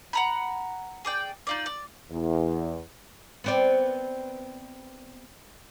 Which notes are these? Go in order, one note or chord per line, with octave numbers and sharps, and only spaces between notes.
F#5 A#5 B5
G#4 D5 G5
D#4 F4 D5
D5
E2
B3 C4 D5